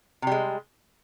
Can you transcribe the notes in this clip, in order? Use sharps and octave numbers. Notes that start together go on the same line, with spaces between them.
C3 G3 G#3